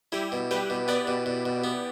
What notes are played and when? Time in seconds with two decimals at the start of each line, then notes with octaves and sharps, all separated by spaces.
0.12 G3 E4 G4
0.32 B2
0.51 G3 G4 B4
0.70 B2
0.88 B3 B4 D5
1.07 B2
1.26 B2
1.46 B2
1.64 B3